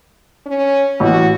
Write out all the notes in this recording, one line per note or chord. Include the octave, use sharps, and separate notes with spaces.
C#4
A1 F#4